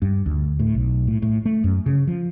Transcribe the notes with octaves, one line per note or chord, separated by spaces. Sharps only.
G2
D2
A2
B1
A2
A2
A3
F#2
C#3
F3